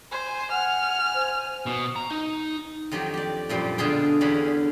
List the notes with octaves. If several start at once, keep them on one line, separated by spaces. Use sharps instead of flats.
C5 G#5
F#5 F6
C5
B2
A#5
D#4
F2 D#3 F#3 G4
G4 D5
F#2 A#2 F3 G3
B2 D3 F4 G#4 G5
E2 D3 C#4 G#4 B5